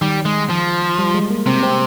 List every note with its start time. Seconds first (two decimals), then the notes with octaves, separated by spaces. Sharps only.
0.02 D#3 G3
0.25 G#3
0.50 F3
0.99 G3
1.14 G#3
1.30 A#3
1.46 C3 C4
1.63 C4